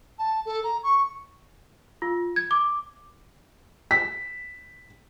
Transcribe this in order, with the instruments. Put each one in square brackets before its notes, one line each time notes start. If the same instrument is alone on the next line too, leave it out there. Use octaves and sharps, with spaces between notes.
[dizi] A5
A4
A#5
C#6
[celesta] F4
G#6
D6
[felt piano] B6